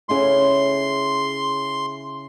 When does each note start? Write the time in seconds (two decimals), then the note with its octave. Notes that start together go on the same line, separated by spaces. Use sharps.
0.09 C#3 E4 C6 D6